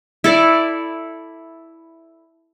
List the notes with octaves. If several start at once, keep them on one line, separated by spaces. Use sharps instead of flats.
E4 A4 D5